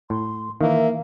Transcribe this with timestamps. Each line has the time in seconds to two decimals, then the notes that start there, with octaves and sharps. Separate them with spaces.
0.10 A2 C6
0.61 D#3 E3 A#3 E5